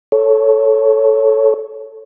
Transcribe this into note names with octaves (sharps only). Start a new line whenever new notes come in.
A4 C#5